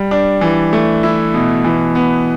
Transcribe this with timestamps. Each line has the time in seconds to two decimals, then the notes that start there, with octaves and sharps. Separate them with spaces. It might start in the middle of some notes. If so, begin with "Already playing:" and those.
Already playing: G3
0.11 D4
0.41 E3
0.73 A3
1.03 E4
1.34 B2
1.64 E3
1.95 B3